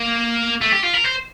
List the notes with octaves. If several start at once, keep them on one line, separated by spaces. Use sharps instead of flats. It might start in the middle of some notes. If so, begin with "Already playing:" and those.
Already playing: A#3
A3
G4
F4
A#4
C5